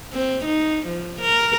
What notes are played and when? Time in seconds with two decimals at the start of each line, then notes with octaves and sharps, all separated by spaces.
0.13 C4
0.45 D#4
0.87 F3
1.22 A#4